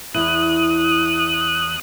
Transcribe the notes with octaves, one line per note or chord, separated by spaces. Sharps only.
E2 E4 D#6 F#6